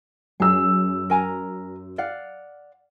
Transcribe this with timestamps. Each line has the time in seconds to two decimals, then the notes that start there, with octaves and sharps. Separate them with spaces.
0.40 F#2 G#4 E6
1.10 A#4 G#5 A#5
1.98 D5 F5 F#5